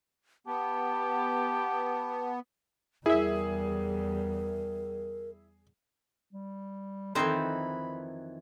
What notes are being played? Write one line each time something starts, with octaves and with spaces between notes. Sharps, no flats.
B3 G4 A5
E2 G3 E4 G#4 A#4 E5
G3
F2 D#3 E3 C4 D#4 C5 B5